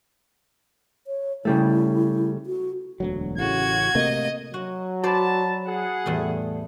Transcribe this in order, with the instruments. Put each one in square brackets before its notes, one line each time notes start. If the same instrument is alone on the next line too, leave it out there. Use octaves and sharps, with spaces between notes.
[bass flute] C#5
[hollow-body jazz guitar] C#3 G3 A3 [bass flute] E4
[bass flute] F#4
[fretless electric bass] E1 D2 F#3
[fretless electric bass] A1 A2 C#3 [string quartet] F#4 [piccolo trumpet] G#6
[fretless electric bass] C3 A3 A#3 [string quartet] D#5
[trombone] F#3 [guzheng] F#4
[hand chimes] F#4 B5 [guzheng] C5 D5 [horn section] A5
[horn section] G#4 F#5
[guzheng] E2 A2 G3 [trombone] A3